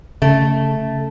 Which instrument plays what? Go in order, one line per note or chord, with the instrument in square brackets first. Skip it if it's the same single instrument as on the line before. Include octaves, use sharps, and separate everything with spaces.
[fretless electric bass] C#3 [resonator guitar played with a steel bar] A3